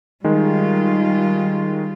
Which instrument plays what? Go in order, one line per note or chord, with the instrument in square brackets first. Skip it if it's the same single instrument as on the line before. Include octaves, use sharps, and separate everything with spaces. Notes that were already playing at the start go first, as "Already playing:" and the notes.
[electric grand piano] D#3 G#3 [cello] G3 F4